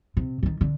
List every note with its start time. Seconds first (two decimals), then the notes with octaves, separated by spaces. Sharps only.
0.17 C3
0.43 D3
0.46 D#3
0.61 D3